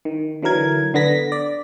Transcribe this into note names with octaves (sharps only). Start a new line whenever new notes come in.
D#3
D3 E3 F#3 A#4 G#6
D3 B3 A#6 B6
D5